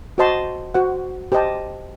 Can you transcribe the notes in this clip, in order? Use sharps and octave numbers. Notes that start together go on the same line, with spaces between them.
F#4 C5 D#5 A5 C6
F#4 C5 F#5
G4 C5 D#5 A5